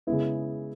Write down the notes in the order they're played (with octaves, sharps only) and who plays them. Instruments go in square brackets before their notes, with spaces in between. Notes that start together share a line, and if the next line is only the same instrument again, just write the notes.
[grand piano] C#3 G#3 B3 E4